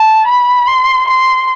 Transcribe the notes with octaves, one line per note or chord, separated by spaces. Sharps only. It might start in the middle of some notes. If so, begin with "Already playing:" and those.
Already playing: A5
B5
C6
C6